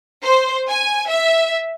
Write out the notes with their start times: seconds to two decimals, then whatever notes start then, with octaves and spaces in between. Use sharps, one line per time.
0.23 C5
0.68 G#5
1.09 E5